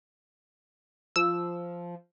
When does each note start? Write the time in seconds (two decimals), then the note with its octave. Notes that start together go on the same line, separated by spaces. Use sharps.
1.16 F3 E6